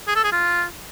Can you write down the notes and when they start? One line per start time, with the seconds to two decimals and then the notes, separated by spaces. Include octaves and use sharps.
0.07 G#4
0.16 A4
0.24 G#4
0.32 F4